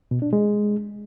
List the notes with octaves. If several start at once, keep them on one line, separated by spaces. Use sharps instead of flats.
B2
D4
G#3